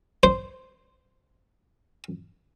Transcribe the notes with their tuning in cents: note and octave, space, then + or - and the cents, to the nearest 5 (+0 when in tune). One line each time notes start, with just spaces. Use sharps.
C5 -10